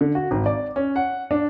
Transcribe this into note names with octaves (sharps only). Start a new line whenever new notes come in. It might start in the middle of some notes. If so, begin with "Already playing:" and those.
D3
F#4
G#1
D5
C#4
F#5
D4